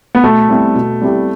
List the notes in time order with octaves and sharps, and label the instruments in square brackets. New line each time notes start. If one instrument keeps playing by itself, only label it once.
[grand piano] B3
[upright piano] B2 [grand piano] A3
[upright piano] G3 C4 E4 G4
B2
G3 C4 E4 G4